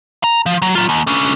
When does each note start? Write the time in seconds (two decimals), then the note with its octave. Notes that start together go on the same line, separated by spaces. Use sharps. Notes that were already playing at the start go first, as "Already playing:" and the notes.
0.24 A#5
0.46 F3
0.62 F#3
0.75 F#3 F4
0.89 D#2
1.07 D3 C#4